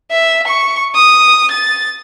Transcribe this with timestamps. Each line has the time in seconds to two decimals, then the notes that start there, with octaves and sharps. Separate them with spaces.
0.11 E5
0.47 C#6
0.95 D#6
1.51 A6